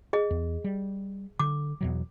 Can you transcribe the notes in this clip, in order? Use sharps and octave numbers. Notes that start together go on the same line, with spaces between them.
G#4 D#5
E2
G3
D3 D6
E2 B2 F#3